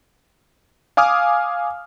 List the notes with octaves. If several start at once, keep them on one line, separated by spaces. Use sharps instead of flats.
F5 G#5 D6 D#6 F6